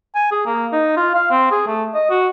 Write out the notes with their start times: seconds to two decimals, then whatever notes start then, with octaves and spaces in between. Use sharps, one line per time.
0.16 G#5
0.32 G#4
0.46 A#3
0.73 D#4
0.97 F4
1.15 F5
1.31 C4
1.52 G#4
1.67 A3
1.95 D#5
2.10 F#4